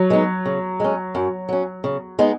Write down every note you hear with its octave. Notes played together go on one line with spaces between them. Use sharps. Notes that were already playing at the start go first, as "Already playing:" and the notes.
Already playing: F#3
G#3 B3 D#4
C#3
G#3 C#4
F#2
F#3 C#4
C#3
G#3 B3 D#4